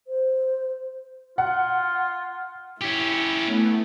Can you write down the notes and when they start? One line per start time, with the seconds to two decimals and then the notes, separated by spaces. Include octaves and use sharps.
0.07 C5
1.38 F4 F#5
2.81 C#4 E4 G4
3.45 A3 B3